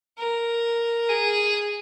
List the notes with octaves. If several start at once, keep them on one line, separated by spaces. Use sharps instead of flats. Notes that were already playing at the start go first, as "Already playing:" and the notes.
A#4
G#4